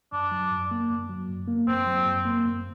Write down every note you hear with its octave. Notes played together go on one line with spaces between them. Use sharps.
F#2 D4
F#3
F#2
A#3
F#2
F#3
F#2
A#3
F#2 C4
F#3
F#2
A#3
F#2